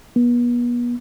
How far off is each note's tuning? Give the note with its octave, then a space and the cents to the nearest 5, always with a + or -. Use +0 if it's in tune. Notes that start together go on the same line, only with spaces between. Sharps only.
B3 -35